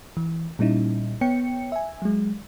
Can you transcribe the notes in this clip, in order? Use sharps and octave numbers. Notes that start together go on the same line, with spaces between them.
E3
A#2 G3 C#4 D#4 E4
B3 C#5 G5 C#7
E5 G#5
F#3 G#3